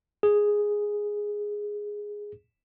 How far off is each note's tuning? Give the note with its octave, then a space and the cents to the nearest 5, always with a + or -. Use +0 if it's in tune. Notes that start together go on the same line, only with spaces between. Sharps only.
G#4 -5